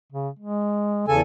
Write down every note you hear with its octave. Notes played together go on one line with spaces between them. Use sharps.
C#3
G#3
E2 C#3 A4 G#5